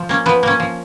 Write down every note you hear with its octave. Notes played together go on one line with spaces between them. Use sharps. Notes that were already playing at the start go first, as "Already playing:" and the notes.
Already playing: F3
A#3 C#4
F3 B3 B4
A#3 C#4
F3